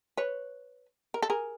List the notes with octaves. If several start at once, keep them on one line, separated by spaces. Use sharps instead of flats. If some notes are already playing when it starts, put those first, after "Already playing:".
B4 C#5
A#4
A4
G#4 A#4